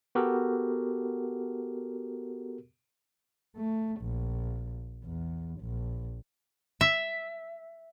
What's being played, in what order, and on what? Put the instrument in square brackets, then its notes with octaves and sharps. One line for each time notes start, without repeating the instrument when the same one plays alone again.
[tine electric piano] B3 F#4 G4 A4 A#4
[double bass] A3
A#1
E2
A#1
[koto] E5